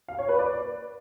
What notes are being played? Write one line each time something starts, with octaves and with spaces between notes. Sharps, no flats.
F5
C#5
B4
D5